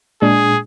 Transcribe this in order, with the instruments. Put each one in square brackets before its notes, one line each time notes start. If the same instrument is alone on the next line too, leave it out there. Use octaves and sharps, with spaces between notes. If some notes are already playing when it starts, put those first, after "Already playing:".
[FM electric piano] A#2 G#3 D4 [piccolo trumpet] G#4